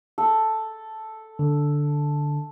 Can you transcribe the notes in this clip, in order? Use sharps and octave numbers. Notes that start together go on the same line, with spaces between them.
A4
D3